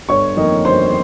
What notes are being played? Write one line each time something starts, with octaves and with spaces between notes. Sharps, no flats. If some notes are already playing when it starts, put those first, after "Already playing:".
G1 C#5 C#6
F2 D#3 A#3 D#4
G1 C5 C6